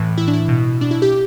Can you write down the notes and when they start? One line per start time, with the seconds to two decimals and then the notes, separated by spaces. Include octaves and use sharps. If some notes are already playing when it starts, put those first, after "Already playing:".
Already playing: A2 E3
0.18 E4
0.28 D4
0.33 E4
0.48 B2
0.81 D4
0.91 E4
1.02 G4